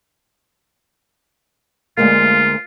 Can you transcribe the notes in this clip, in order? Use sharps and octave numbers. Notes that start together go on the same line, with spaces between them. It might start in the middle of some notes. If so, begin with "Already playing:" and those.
D2 G#3 A#3 F4